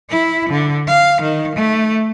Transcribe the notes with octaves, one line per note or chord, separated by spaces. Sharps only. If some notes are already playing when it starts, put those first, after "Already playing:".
E4
D3
F5
D#3
A3